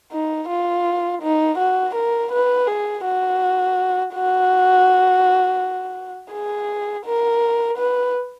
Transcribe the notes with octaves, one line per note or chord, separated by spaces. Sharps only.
D#4
F4
D#4
F#4
A#4
B4
G#4
F#4
F#4
G#4
A#4
B4